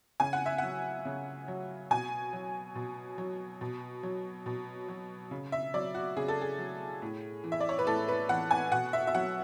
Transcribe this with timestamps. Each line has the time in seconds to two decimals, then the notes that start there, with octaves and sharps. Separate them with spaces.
0.20 C#3 G#5
0.33 F#5
0.46 E5
0.58 F#3 F#5
1.05 C#3
1.48 F#3
1.90 B2 G#5
2.33 F#3
2.75 B2
3.18 F#3
3.61 B2
4.03 F#3
4.46 B2
4.88 F#3
5.31 C#3
5.52 E5
5.74 F#3 D5
5.95 F#4
6.17 C#3 G#4
6.28 A4
6.41 G#4
6.59 F#3
7.02 A2
7.44 E3
7.52 E5
7.60 D5
7.69 C#5
7.79 B4
7.87 A2 A4
8.08 B4
8.29 E3 F#5
8.51 G#5
8.72 B2 F#5
8.93 E5
9.07 E5
9.15 F#3 F#5